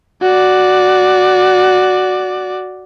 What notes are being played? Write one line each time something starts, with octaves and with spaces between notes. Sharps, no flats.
F#4 D5